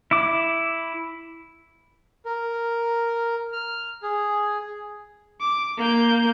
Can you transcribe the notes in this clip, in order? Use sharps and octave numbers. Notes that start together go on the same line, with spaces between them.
E4 D6
A#4
F6
G#4
D6
A#3 G6